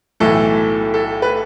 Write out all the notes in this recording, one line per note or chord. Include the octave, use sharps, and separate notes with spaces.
B1 A2 E3 A3 A4
A4
B4